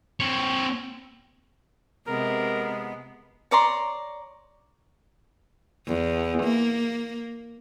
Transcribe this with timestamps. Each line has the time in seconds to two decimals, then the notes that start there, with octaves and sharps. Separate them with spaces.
0.20 C4 C#5
2.07 C3 G#3 B3 A#4
3.51 C#5 D5 A#5 C6
5.87 E2
6.43 A#3